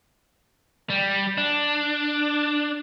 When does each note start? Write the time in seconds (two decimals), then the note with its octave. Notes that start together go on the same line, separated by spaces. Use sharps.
0.90 G3
1.38 D4